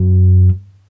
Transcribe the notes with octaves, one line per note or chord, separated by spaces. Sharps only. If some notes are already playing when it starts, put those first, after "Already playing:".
Already playing: F#2